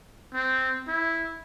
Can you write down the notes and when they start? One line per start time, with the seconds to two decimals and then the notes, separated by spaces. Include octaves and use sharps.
0.34 C4
0.88 E4